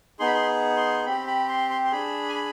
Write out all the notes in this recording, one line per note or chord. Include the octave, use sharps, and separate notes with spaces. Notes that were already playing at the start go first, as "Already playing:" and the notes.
B3 D#4 G#4 C6
B5
C6
C6
C4 G4 B5
B5
C6
C6
C6
D4 G#4 B5
G#5
B5